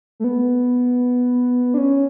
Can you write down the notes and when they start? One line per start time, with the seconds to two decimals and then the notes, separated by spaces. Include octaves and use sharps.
0.20 A3
0.24 B3
1.74 D4
1.78 C#4